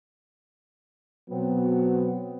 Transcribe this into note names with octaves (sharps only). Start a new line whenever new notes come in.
B2 F#3 B3 C4